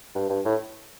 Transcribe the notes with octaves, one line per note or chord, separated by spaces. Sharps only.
G2
G2
A2